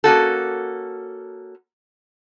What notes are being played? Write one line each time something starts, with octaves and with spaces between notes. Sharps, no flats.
A#3 C#4 F#4 A4